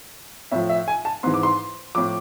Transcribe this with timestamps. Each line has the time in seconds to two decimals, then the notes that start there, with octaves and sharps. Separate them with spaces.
0.51 A2 F3 E5
0.69 E5
0.88 G#5
1.05 A5
1.23 G#2 E3 C6
1.34 D6
1.43 C6
1.95 A2 F3 D6